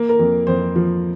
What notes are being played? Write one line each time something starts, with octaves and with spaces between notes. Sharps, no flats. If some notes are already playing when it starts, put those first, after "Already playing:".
Already playing: A#3
A#4
F2
F2 C5
F3